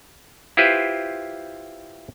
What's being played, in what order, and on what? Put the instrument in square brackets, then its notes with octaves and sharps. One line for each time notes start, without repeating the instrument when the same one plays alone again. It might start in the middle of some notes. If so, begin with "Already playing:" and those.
[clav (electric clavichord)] E4 F4 G4 B4 C5